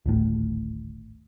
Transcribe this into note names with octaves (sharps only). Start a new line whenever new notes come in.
D1 G#1 A2